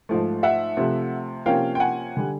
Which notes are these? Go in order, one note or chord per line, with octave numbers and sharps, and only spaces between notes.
G#2 F3 A3
E5 F#5
C3 F3 A3
C3 F3 A#3 C#4 F5 G5
G5
F#5 G#5
D3 G3